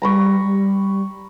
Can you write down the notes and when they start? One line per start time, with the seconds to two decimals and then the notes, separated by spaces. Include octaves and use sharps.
0.02 G3 A#5 B5 C#6
0.44 G3